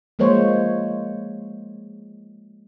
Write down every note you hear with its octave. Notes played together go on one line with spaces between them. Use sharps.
F3 G#3 A#3 C5 C#5